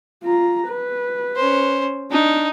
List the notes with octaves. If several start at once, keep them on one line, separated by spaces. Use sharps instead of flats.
F4 A#5
B4
C#4 C5
D4 D#4